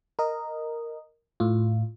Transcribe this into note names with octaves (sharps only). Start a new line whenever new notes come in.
A#4 D#5
A2 F4